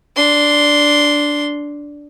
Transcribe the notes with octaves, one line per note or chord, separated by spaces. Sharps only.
D4 C6